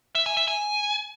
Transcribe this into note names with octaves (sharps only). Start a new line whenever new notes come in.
E5
G#5
E5
G#5